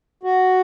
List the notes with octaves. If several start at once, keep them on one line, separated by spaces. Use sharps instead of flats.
F#4